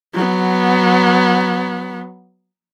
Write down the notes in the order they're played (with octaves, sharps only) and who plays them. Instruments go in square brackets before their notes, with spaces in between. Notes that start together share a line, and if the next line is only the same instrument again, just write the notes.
[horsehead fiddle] F#3 B3